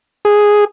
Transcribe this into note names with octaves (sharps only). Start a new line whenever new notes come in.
G#4